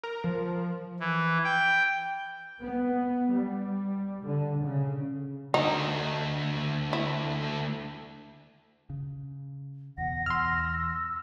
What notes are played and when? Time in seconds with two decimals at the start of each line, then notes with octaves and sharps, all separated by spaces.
0.03 A#4
0.24 F3
1.00 E3
1.44 G5
2.62 B3
3.33 G3
4.26 D3
4.63 C#3
5.54 D3 A3 D#4
6.93 E4
8.90 C#3
9.98 E2 B2 F#5 A#6
10.26 E2 C6 E6 F6